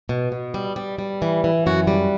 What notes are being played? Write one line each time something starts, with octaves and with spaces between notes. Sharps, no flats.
B2
B2
G3
G3
G3
E3
E3
F#2 F#4
G3